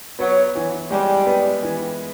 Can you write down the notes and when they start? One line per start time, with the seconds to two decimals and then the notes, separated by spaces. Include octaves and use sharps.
0.19 F#3 B3
0.55 E3
0.91 G3 G#3
1.26 B3
1.63 E3